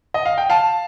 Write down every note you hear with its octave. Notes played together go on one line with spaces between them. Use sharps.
D#5
F5
G5
F5 A5